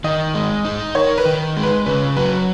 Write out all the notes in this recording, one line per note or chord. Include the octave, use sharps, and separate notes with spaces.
D#3 D#5
G#3
D#4
A#4 C#5
B4
D#3
G#3
B4
C#3 B4
F#3 B4